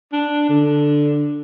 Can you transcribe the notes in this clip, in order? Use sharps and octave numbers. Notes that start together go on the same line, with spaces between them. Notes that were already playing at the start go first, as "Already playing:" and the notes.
D4
D3